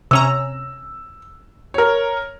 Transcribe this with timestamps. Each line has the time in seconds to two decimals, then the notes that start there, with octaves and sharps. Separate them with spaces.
0.11 C3 C#4 A#5 E6
1.74 A#4 C#5